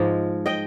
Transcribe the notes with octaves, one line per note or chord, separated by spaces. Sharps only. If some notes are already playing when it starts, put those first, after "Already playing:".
Already playing: G#2 F3 G#3
D#5 G5